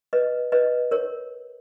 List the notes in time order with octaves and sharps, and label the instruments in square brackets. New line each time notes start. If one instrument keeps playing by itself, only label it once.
[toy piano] B4 D#5
B4 D#5
A#4 C#5